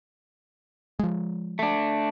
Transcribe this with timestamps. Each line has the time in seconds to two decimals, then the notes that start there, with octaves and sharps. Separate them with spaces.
0.99 F3 G#3
1.59 A3 D4